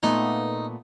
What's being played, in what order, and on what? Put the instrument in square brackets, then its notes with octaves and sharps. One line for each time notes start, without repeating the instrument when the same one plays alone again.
[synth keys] A#2 A3 B3 [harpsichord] D#4